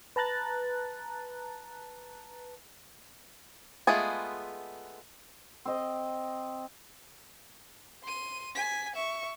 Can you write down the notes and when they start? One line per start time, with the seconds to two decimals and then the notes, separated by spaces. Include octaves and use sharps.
0.16 B4 A5 A#5 F#6 A6
3.87 G#3 A3 B3 F4 G#4
5.65 C4 D#5
8.03 C6 D#7
8.55 G#5 B6
8.95 E5 C#6